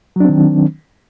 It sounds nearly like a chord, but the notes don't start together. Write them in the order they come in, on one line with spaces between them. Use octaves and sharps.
F#3 D4 C4 D#3